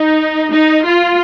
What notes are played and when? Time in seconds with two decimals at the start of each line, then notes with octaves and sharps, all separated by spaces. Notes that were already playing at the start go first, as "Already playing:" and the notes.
Already playing: D#4
0.53 D#4
0.85 F4